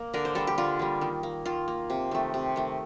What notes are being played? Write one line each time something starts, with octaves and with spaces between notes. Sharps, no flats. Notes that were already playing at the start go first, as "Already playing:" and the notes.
Already playing: A#3
D3 A#4
C5
G3 A#3 A4
G4
D3 F4
G3 A#3
D#3
A#3
D#3 F4
A#3
C3
D#3 A3
C3
D#3 A3